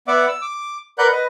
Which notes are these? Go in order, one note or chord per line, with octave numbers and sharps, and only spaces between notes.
B3 D5 E5 F#5 D6
E6
D6
A#4 B4 D5 F#5 F#6 G6
B4 D#5